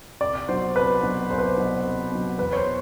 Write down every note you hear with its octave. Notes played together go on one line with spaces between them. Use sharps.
C2 D5
B2 F#3 C5
C2 B4
B2 F#3
C2 C5
B4
C5
B2 F#3
C2
B2 F#3
E2 B4
C#5
C5
B2